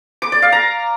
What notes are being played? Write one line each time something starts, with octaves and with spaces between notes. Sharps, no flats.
D6
D5
F5
A#5